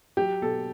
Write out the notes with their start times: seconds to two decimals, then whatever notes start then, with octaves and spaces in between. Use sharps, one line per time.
0.17 F#3 G4
0.42 B2 A4